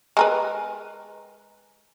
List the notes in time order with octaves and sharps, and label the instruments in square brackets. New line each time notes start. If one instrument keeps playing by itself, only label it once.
[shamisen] G#3 A#4 B4